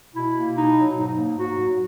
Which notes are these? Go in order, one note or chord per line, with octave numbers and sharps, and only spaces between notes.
B2 E4
A#3
B2 D#4
F#3
G#2 D#4
A#3
G#2 F#4
F#3